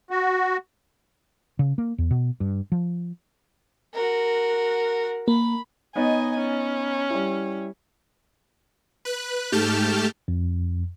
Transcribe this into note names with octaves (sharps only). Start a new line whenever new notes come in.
F#4
C#3
A#3
E2
B2
G2
F3
F#4 A#4
A#3 B5
B3 D#4 C#5 D#5 G#5
C#4
G3 E4
B4 F#6
G#2 A3 G4 A5 F6 G6
F2